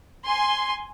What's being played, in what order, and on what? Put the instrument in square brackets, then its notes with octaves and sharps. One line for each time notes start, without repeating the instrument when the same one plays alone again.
[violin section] G#5 C6